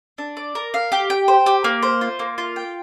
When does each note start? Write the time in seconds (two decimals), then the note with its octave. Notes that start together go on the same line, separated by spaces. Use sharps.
0.18 D4
0.37 D5
0.55 A#4
0.74 F5
0.92 G4
1.10 G5
1.28 C5
1.46 G4
1.64 A#3
1.83 C5
2.01 F4
2.19 A#3
2.38 F4
2.56 G5